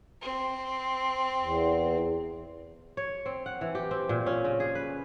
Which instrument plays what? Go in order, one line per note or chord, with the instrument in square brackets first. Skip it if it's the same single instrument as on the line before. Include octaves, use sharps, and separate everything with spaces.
[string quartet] C4
[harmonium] E2
[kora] C#5
C4
F#5
E3
G4
C4
A#2
C#4
C#3
G#4
B4